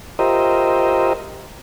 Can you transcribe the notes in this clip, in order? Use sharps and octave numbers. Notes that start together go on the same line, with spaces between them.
F4 G4 A#4 C5 D#5 E5